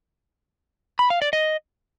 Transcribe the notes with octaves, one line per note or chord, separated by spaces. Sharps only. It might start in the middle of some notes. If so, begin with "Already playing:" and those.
B5
F5
D5
D#5